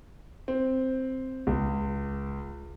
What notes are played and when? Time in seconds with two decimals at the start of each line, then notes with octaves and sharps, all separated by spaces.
0.48 C4
1.47 C#2